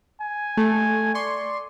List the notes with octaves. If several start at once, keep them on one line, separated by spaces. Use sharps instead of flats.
G#5
A3
D5 C6 C#6